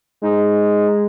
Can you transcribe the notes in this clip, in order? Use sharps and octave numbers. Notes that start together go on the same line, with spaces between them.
G#3 D#4